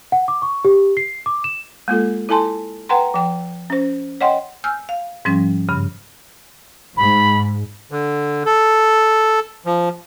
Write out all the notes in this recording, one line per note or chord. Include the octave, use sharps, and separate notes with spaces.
F#5
D6
C#6
G4
C7
D6
E7
G#3 A#3 F4 A4
E4 A4 G#5 A5 C6
B4 F#5 G5 A#5 C6
F3 G5
C#4 C5
C#5 D#5 F#5 G5 C6
G#5 E6 F6 G6
F5
G#2 F3 G3 C#4
G2 C#3
G#2 B5
D3
A4
F3